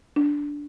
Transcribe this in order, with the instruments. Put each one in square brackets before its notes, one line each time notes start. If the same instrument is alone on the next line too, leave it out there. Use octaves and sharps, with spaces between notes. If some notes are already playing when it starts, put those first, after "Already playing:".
[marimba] D4